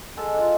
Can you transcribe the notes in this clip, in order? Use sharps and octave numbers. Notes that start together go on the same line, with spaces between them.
G#3 A4
D4 F4